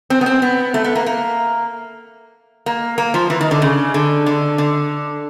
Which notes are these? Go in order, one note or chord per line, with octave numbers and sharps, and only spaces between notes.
C4
B3
C4
B3
A3
B3
A#3
A#3
A#3
A#3
F3
E3
D#3
D3
C#3
D3
D3
D3